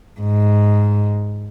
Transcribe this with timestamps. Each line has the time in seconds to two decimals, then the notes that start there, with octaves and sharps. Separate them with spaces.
0.20 G#2